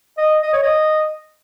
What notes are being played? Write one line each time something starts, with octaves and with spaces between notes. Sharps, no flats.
D#5
D#5
C#5
D#5